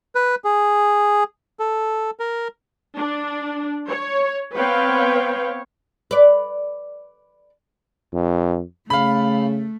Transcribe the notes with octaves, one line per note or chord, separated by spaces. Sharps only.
B4
G#4
A4
A#4
D4
C#5
B3 C4 B4 C#5 F5 G5
B4 D5
F2
C#3 A3 F5 B5